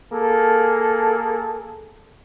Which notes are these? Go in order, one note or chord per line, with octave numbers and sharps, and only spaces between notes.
A#3 G#4 A4